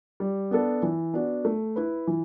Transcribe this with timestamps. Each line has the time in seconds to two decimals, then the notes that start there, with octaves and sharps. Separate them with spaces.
0.20 G3
0.51 B3 D4 A4
0.83 E3
1.14 B3 D4 F#4
1.45 A3
1.76 E4 B4
2.07 E3